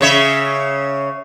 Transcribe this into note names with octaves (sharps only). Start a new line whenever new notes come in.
C#3 C#5 E5